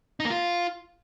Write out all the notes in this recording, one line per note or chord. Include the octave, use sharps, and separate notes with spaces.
D#4
A#3
F4